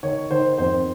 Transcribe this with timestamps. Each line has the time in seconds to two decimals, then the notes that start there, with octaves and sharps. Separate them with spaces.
0.03 D#3 C#5
0.31 D#3 C5
0.58 F2 C5